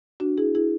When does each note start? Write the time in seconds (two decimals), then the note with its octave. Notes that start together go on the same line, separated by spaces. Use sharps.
0.20 D4 F#4
0.38 E4 G#4
0.55 E4 G#4